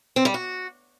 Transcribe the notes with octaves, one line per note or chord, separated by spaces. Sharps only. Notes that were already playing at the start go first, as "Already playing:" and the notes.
C4
G3
F#4